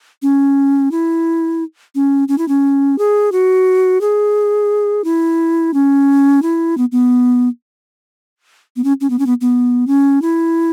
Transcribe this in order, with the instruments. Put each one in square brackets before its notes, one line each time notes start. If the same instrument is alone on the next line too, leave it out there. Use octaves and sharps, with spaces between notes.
[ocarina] C#4
E4
C#4
C#4
E4
C#4
G#4
F#4
G#4
E4
C#4
E4
B3
B3
B3
C#4
C#4
B3
C#4
B3
B3
C#4
E4